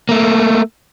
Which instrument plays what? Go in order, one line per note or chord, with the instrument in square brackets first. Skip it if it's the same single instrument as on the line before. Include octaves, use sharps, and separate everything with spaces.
[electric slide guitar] A3 A#3